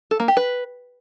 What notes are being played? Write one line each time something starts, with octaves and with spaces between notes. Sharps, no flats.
A4
A#3
G4
B4